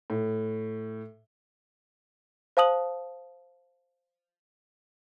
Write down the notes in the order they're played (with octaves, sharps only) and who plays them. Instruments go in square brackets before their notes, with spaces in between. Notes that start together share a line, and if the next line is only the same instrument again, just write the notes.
[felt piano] A2
[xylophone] C5 F5 A5 D#6 F#7